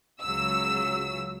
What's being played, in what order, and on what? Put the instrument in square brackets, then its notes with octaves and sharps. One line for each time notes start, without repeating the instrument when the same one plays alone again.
[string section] C#2 C#3 F#3 E6